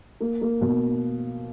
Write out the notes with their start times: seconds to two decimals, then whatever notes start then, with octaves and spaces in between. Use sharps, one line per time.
0.21 A#3
0.42 A#3
0.61 B2